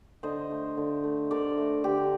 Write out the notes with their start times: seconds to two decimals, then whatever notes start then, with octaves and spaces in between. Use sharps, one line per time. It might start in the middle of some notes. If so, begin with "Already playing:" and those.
0.23 D3 C5 D#5
0.51 A3
0.77 D3
1.03 A3
1.31 D3 A#4 D5
1.58 A3
1.84 D3 G4 A#4